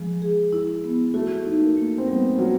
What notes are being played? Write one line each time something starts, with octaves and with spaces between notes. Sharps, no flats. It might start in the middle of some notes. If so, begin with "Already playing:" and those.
Already playing: F3 G#3
G#4
E4
B3
A3 F#4
D#4
A#3
A#3
C4
G3 B3
F#3 F4